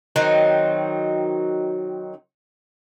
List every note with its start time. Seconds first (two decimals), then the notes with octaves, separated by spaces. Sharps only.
0.16 D#3 F#3 C4 D#4